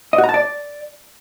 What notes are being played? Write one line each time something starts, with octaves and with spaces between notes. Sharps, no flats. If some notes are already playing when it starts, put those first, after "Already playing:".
D#5
F#4
A#5
A5
D5